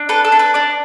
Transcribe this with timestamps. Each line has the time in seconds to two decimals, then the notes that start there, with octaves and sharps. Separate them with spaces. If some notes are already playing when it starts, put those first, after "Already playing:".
Already playing: D4
0.09 A4 B4
0.25 A4
0.32 D4
0.39 B4
0.54 D4 D5